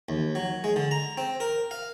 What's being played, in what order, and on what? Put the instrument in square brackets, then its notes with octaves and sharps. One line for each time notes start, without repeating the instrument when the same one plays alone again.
[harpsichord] D#2
F#3
G#3
D3
A#5
C4
A#4
F5